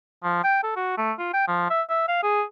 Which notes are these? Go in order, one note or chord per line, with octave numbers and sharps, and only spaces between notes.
F3
G5
A4
F#4
A3
F4
G5
F3
E5
E5
F5
G#4